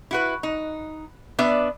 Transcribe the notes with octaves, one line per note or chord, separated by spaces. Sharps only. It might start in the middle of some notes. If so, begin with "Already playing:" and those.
E4 F#4 B4
D#4
B3 D4 D5 E5